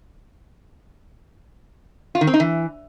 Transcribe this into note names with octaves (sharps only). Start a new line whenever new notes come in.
F4
D#3
C4
D#4
E3